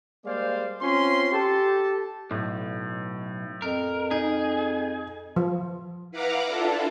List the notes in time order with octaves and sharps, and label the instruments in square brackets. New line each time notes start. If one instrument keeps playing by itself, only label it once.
[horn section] G3 G#3 A#3 C5 D5 F5
C4 C#4 F4 C6
G4 A4 A5
[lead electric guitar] B1 [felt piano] A2
[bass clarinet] F2 [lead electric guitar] A#4
[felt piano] D#4 [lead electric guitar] G#4
[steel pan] F3
[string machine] E4 B4 F5 F#5 A#5 D6
D4 E4 F4 A4